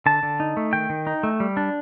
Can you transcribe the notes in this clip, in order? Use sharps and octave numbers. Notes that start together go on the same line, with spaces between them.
D3 A5
D3
D#4
A3
D#3 G5
D#3
D#4
A3
G3
D4